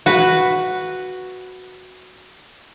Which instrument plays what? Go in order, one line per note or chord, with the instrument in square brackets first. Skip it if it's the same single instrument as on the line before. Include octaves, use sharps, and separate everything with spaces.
[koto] F#4 B4